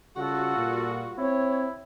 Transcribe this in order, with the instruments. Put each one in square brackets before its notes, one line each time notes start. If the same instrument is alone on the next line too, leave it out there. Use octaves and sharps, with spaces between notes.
[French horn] C#3 [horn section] G3 F4 F#4 [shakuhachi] A4 [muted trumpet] F#5
[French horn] A#2
[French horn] C4 [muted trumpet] E4 [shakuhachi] C#5